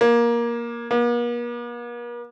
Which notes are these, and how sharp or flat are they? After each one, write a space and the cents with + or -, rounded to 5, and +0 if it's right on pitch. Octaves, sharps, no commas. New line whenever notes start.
A#3 +15
A#3 +45